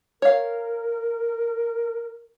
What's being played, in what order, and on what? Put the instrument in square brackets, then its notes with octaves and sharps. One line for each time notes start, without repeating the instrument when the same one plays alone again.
[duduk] A#4 [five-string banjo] C#5 F5